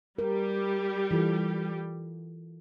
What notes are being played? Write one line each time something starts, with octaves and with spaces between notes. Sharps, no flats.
G3 G4 A#4
E3 F4 A4